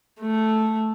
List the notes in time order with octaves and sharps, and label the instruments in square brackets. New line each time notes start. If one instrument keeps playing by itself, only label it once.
[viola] A3